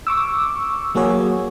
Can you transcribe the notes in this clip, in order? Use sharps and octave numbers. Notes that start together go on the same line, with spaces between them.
C#6 D6 E6
F#3 A#3 F#4 G#4 C#5